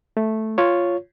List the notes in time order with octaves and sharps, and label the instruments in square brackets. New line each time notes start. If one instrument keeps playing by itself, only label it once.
[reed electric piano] A3
F4 C#5